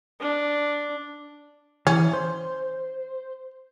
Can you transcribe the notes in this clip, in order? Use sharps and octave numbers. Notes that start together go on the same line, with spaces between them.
D4
E3 C#4
C5